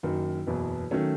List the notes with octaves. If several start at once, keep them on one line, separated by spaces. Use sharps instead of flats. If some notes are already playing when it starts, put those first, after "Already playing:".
F#1 F#2 D#3
F#1 E2 B2 F#3
D#3 F#3 A3 C#4